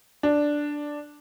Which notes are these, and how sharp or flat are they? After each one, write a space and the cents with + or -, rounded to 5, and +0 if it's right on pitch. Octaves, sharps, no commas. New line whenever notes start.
D4 +0